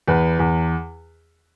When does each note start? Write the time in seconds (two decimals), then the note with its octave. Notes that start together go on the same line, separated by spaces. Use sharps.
0.08 E2 B4
0.39 E2